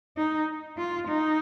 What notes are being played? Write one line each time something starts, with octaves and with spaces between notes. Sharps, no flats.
D#4
F4
D#4